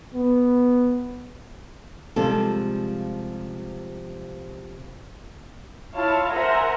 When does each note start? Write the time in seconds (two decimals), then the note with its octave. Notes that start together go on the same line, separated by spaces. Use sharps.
0.14 B3
2.16 C3 F3 G3 G#3 C4 A4
5.94 E4 F4 C#5 F5 A5
6.32 A#4 C5 E5 F#5 G#5 A#5